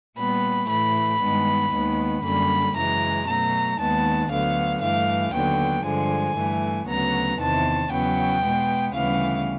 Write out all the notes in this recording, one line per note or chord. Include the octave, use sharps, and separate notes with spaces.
A#2 G3 B3 B5
A2 E3 A3 B5
G2 D#3 G#3 B3
D#2 D#3 G#3 B3
F#2 D3 G3 A#3 B5
F#2 C#3 E3 G#3 A#5
B2 F#3 A3 A#5
D#2 D#3 G#3 B3 A5
D2 D3 F#3 B3 F5
G2 E3 A3 F5
D#2 D3 F#3 B3 G5
G2 D3 F3 G#3 G#5
G2 E3 A3
D2 C#3 F#3 B3 A#5
E2 C3 D#3 A5
E2 C#3 F#3 B3 G5
B2 G#3 B3
D2 C#3 E3 G3 B3 F5